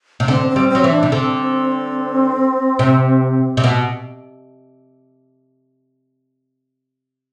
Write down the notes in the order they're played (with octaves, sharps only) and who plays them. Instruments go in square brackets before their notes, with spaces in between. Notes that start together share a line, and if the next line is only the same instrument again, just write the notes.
[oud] C3
[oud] D3 [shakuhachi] C4
[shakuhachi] C4
[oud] G3
[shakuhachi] C4
[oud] F#3
E3
[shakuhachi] D4
[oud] C3
[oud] D3 [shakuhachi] C4
[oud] C3
C3
B2